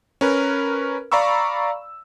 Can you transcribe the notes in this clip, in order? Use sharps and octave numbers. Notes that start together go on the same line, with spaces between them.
C#4 A#4 B4
D5 F5 A#5 B5 C#6 E6